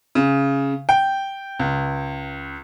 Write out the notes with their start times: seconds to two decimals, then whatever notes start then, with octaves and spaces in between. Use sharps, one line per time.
0.15 C#3
0.89 G5
1.59 C#2